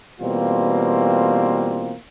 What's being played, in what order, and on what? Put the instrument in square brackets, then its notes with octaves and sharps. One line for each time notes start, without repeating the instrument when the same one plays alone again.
[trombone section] B2 E3 G3 A#3 C4 F4